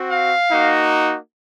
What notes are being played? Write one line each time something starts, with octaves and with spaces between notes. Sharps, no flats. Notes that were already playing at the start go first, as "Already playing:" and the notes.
Already playing: C4 F#4
F5
A#3 D#4 F#4